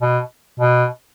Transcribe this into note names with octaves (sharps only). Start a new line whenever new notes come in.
B2
B2